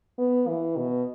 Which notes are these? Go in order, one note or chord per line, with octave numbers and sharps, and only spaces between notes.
B3
E3
B2